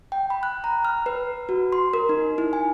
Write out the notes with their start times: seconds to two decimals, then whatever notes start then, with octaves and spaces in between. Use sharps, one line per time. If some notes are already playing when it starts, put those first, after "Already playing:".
0.12 G5
0.30 B5
0.43 F#6
0.64 A#5
0.85 F6
1.06 B4
1.49 F#4
1.72 C6
1.94 A#4
2.09 D#4
2.38 E4
2.53 G#5